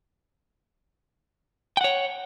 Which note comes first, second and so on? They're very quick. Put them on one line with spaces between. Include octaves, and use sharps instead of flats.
G5 F#5 C#5